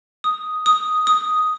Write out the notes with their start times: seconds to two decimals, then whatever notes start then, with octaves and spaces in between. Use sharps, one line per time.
0.24 D#6
0.66 D#6
1.07 D#6